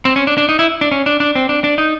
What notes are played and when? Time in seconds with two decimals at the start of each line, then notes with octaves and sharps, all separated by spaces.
0.05 C4
0.16 C#4
0.27 D4
0.38 D4
0.49 D#4
0.59 E4
0.81 D4
0.91 C#4
1.06 D4
1.20 D4
1.35 C4
1.49 D4
1.64 D4
1.78 D#4